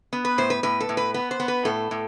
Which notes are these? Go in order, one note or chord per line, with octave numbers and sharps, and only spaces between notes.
B3
B4
A2 C5
B4
A2 B4
A4
A2
B4
B3 B4
C5
B3
B4
A2 A4
A2